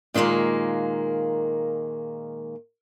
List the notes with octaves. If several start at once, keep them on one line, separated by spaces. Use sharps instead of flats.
A#2 D#3 E3 G#3 A#3